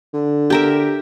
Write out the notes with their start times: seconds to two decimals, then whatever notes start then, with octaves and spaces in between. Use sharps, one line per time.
0.14 D3
0.50 G4 A#4 E5